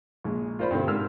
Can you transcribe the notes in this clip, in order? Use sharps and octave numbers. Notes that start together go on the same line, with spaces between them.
A#1 G#3
F4 A#4 C5 D5 B5
G2 B2 D3 C4
G#2 A#4 E6 F6